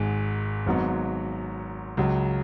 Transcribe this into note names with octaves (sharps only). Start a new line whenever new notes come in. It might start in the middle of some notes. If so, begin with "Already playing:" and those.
Already playing: G#1 G#2 G#3
G#1 G#2 F#3 B3
C#2 C#3 F#3